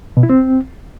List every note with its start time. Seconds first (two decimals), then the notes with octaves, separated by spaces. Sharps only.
0.17 B2
0.23 E4
0.30 C4